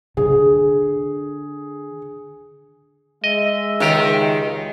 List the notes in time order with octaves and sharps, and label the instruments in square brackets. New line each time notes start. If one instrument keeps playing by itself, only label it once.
[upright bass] D3 [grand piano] G#4
[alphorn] G#3 [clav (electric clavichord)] D#5 [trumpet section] E5
[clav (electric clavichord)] C#2 G4 A#5 [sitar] D#3